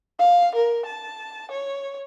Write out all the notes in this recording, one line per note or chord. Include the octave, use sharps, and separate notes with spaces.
F5
A#4
A5
C#5